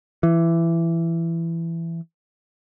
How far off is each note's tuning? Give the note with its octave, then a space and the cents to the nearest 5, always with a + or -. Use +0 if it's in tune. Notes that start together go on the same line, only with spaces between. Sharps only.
E3 +15